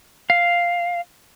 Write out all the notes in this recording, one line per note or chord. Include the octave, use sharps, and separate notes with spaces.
F5